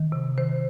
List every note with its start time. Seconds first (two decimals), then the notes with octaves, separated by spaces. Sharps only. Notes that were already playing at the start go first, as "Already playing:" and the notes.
Already playing: D#3
0.12 C3
0.37 D#3 C5